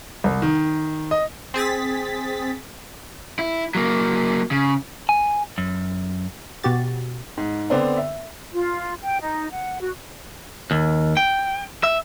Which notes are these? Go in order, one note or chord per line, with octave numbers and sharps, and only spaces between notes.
C2
D#3
D#5
C4 G#4 A6 B6
E4
F#3 A#3
C#3
G#5
F#2
B2 F#4 G4 A6
G#2
D3 B3 C4 D4
E5
F4
G5
D#4
F#5
F#4
D#2
G5
E5